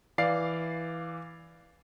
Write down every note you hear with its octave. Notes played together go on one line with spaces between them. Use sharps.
E3 D5 F5 C7